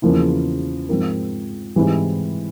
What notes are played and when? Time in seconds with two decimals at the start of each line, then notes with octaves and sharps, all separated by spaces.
0.02 E2 C#3 F3 A#3 E4
0.89 G#2 F3 C4 F4 A#4
1.76 G#2 E3 G3 C4 E4